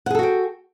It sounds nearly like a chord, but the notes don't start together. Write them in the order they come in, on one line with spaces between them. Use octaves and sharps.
F#5 G#4 A4 F#4 G5